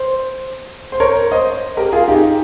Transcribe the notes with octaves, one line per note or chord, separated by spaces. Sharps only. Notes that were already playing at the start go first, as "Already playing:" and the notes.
Already playing: C5
C5
A#4 C#5
C5 D#5
G4 A#4
F4 G#4
D#4 G4